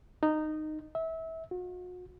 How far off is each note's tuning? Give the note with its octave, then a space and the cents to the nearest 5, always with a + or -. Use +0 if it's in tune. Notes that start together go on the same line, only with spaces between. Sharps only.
D#4 -15
E5 -25
F#4 -40